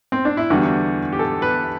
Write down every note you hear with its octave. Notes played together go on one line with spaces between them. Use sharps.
C4
D4
E4
E2 D3 G3 F#4
G4
A4
B4